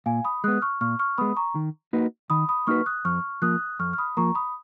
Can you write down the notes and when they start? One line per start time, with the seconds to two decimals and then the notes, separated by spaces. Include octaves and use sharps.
0.06 A#2 F5 G#5
0.25 B5 D#6
0.44 G#3 B3 D#6 F#6
0.62 C#6 F6
0.81 A#2 C#6 F6
0.99 C#6 F6
1.18 G#3 B3 B5 D#6
1.36 A#5 C#6
1.55 D#3
1.93 A#3 D#4 F#4 B4
2.30 D#3 B5 D#6
2.49 B5 D#6
2.67 A#3 D#4 F#4 B4 C#6 F6
2.86 D#6 F#6
3.05 F2 C#6 F6
3.42 F3 A#3 D#6 F#6
3.79 F2 C#6 F6
3.93 F6
3.98 B5 D#6
4.17 F3 A#3 A#5 C#6
4.35 B5 D#6